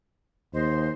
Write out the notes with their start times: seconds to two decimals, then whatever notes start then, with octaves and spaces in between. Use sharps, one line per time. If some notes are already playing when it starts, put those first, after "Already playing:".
0.53 D#2 C5 D#5 C6